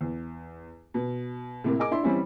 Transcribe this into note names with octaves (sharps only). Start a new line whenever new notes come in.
E2
B2
A2 C3 A#3
G#4 A#4 D#5 G#5 D6
D4 E4 C6
E3 G3 C4 C#4 E4